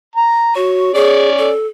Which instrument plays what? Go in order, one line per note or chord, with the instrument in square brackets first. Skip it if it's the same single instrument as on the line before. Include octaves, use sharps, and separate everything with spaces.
[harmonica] A#5
[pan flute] F#4 [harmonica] C#5
[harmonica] C#4 C#5 D5 [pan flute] G#4
[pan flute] A4